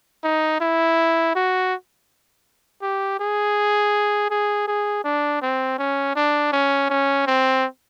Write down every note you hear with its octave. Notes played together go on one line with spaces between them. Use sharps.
D#4
E4
F#4
G4
G#4
G#4
G#4
D4
C4
C#4
D4
C#4
C#4
C4